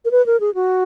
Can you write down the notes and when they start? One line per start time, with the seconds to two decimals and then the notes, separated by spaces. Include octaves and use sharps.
0.05 A#4
0.11 B4
0.26 A#4
0.40 G#4
0.55 F#4